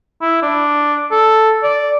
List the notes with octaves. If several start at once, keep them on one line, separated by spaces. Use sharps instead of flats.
E4
D4
A4
D5